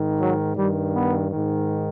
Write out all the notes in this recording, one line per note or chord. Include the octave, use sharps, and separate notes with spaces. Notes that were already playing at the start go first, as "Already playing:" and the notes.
Already playing: G#2 D#3
F#3
G2 D#3 G3
B3
G#2 D#3